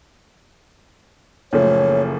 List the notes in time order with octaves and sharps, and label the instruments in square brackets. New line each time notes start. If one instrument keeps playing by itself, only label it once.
[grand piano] F#1 [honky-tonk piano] A#2 F3 A3 [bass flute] C#5